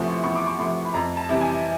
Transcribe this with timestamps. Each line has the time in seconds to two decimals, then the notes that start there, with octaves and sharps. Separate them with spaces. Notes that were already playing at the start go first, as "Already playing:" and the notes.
Already playing: E2 C3 F3 A3 C6 C#6
0.24 E2 C#6
0.35 D6
0.47 C#6
0.58 C3 F3 A3 C6
0.85 B5
0.94 F2 A#5
1.17 A5
1.29 C3 E3 G3
1.41 G#5